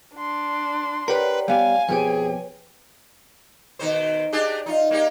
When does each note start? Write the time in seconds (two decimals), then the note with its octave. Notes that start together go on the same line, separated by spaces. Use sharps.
0.15 D4 C6
1.08 G4 A#4 B4 C#5 D5 F#5
1.48 G3 B3 G4 F5 G#5
1.89 F2 B2 G4 G#4 B4 C#5
3.79 B2 D#3 C5
4.33 D4 G4 G#4
4.66 D#4 F4
4.91 A#3 D#4 G4